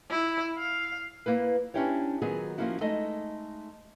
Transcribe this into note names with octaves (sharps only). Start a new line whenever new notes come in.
E4
F5
A#3 E4 B4
C#4 D4 E4 G4 C5 C#5
D#3 F#3 B3 F4 G#4
F3 F#3 A#3 C#4 E4 F#4
G#3 A3 D#4 D#5